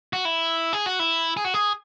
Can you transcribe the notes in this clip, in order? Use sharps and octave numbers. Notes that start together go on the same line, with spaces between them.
F#4
E4
G#4
F#4
E4
G#4
F#4
G#4